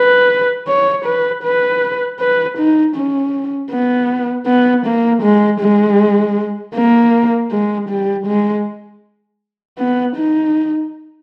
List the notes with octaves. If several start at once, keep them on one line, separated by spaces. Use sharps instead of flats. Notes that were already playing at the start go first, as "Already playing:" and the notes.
Already playing: B4
C#5
B4
B4
B4
D#4
C#4
B3
B3
A#3
G#3
G#3
A#3
G#3
G3
G#3
B3
D#4